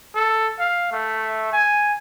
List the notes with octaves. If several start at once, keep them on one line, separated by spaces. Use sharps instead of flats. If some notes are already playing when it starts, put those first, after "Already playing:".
A4
F5
A3
G#5